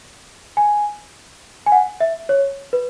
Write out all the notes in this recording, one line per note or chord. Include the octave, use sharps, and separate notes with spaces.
G#5
G#5
F#5
E5
C#5
B4